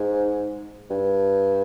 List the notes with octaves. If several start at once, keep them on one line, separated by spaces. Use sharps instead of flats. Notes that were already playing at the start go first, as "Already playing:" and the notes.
Already playing: G#2
G2